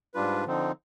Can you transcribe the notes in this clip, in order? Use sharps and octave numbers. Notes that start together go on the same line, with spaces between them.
G#2 G3 D4 F4 B4
D3 F3 C4 D#4